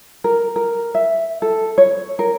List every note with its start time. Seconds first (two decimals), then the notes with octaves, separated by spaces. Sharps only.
0.24 A#4
0.56 A#4
0.95 E5
1.42 A4
1.78 C#5
2.19 A#4